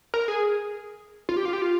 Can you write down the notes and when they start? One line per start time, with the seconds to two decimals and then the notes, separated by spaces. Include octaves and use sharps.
0.14 A#4
0.28 G#4
1.29 F4
1.37 G4
1.45 F4
1.53 G4
1.62 F4